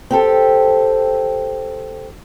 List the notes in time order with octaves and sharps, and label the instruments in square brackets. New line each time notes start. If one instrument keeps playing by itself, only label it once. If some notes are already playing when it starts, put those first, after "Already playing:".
[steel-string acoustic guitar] C4 G4 A4